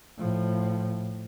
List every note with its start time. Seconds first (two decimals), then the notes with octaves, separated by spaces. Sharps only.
0.18 A2 F3